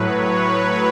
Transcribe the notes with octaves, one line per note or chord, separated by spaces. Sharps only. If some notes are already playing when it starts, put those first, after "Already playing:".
Already playing: A2 F#3 B4 C#5
B4